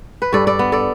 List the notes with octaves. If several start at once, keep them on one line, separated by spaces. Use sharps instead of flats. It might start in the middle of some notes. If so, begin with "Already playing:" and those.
B4
G2 A4 D5
A4 D5
B3
A4 D5